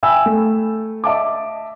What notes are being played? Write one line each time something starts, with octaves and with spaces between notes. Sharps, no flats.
E5 G5 G#5 B5 E6
A3
D#5 E5 A5 D6